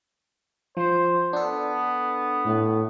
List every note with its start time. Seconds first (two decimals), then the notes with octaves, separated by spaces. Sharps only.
0.77 F3 C5
1.33 B3 D4 A4
2.45 A2